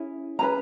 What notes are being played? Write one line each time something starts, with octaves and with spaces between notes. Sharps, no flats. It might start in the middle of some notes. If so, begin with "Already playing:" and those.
Already playing: C#4 E4 G#4
C#4 G#4 B4 A#5